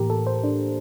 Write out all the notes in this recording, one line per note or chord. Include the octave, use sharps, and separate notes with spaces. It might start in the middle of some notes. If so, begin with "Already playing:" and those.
Already playing: A2 E3 A#3 G4 A#4
A4
C5
D4